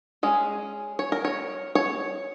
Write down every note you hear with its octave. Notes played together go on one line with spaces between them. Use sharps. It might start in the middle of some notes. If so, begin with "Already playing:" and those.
G#3 C#4 G#4
C#5
A#4
C#5
C#5